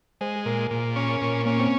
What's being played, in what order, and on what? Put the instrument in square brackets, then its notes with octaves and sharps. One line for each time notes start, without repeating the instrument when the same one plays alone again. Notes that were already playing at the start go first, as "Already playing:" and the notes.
[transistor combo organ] G#3 [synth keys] C5
[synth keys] G#4
[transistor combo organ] A#2 [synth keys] A#4
[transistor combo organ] A#2
C#4
A#2
[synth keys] A#3 [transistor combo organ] C#4
[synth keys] C4